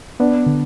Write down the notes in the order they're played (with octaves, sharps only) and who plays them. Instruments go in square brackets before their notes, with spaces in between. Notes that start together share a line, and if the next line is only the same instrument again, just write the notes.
[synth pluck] B3 [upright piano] D4
[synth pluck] D3